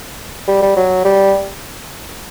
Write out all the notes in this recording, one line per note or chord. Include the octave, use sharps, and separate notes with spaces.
G3
G3
F#3
G3